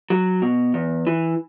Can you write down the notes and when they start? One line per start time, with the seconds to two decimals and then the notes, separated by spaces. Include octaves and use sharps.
0.10 F#3
0.42 B2
0.74 E2
1.07 E3